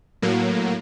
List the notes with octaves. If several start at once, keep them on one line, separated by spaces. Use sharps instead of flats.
A2 F#3 A#3